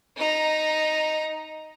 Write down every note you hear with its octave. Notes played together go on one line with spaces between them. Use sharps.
D#4 A#5